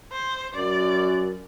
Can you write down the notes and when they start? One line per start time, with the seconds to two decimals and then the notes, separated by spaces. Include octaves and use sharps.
0.12 C5
0.55 F#2 D5